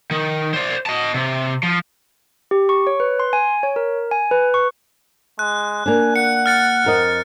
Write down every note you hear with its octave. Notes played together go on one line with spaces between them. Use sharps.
D#3
C5 D5
D#5 A5
C3
F3
G4
C#6
C#5
B4
C6
G#5
C#5
A#4
G#5
B4
C#6
G#3 F#6
A#3 D4 G#5
F#5 C#7
F6 A6 C#7
F2 A#4 D#5